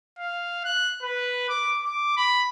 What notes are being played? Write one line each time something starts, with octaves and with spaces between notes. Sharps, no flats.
F5
F#6
B4
D6
D6
B5